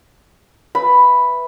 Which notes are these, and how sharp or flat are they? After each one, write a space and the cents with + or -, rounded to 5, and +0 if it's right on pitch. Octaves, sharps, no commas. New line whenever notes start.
B4 +0 E5 +0 B5 +0